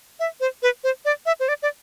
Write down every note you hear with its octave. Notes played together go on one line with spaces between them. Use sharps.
E5
C5
B4
C5
D5
E5
C5
D5
D5